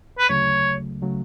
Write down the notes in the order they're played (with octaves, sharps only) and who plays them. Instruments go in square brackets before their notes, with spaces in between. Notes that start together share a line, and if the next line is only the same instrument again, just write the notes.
[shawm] B4
[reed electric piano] D2 C#3 F#3 A3 [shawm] C#5
[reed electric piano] C#3 F#3 A3